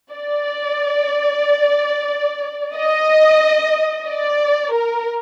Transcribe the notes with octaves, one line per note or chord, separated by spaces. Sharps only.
D5
D#5
D5
A#4